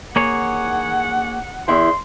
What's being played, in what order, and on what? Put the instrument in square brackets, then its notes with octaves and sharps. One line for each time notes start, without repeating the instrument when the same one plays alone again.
[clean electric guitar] A#3 G#4 C#5 [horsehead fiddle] F#5
[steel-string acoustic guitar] E2 E4 G5 [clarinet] C6